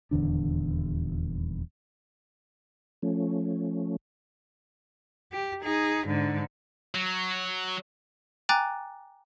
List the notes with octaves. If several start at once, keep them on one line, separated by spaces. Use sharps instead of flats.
D#1 E2 D3 D4
F3 A3 C#4
G4
D#4 G#4
G#2 D3
F#3
G5 G#5 A#5 D6 F#6 A6